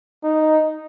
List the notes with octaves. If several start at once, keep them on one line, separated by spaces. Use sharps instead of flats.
D#4